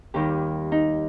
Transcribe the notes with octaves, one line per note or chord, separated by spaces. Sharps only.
D#2 D#3 G3 G4
D#4